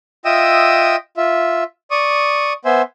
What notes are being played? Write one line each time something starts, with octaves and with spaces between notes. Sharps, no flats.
F4 D#5 E5 G5 D#6 E6
F4 E5
D5 C#6 D#6
B3 C5 E5 G#5